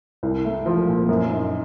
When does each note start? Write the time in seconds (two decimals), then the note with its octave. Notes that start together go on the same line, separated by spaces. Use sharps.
0.23 C2
0.45 A3
0.66 F3
0.87 A#2
1.09 F#2
1.30 D#4